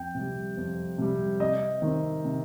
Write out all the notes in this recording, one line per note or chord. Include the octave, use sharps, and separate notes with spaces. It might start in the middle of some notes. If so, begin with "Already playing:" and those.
Already playing: F2 G5
C3
G3
F2
C3 G3
C3 D#5
D#3 C4
C3